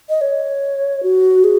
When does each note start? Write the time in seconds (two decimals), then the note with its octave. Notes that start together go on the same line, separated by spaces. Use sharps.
0.09 D#5
0.21 C#5
1.03 F#4
1.44 G#4